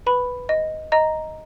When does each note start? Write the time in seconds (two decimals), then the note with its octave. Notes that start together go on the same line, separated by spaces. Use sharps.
0.07 B4 B5
0.49 D#5
0.92 D#5 A#5